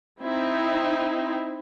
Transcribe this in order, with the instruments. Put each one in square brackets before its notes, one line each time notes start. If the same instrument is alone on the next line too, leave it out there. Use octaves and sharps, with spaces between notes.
[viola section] C4 D#4 E4